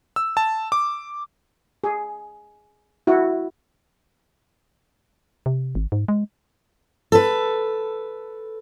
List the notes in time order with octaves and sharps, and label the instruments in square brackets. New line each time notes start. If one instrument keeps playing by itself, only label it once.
[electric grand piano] E6
A5
D6
[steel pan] G#4
E4 F#4
[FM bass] C3
G#1
G#2
G#3
[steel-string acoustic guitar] A4 B4